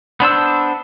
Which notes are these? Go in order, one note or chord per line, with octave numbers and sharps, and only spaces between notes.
B3 D4 C5 E6